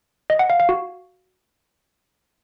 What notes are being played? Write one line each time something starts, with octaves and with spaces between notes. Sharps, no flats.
D#5
F#5
F5
F5
F#4